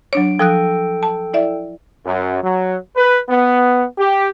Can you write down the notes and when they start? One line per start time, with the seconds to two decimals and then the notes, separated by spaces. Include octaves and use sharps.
0.13 F#3 D4 C#5 D7
0.39 F3 A4 G5 D#6 F#6
1.03 A5
1.34 E4 D5 E5
2.06 F#2
2.42 F#3
2.97 B4
3.29 B3
3.98 G4